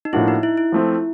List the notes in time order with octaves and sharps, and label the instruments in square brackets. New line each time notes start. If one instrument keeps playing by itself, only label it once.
[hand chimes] D#4
[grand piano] A2 F3 A#3 D4 F#4 [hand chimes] E4
[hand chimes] D#4
E4
E4
[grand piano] F3 A3 C4 F4